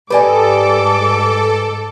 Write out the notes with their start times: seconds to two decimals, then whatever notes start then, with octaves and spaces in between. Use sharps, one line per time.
0.10 G#2 G4 A4 B4 D5 D#5 G#5 D6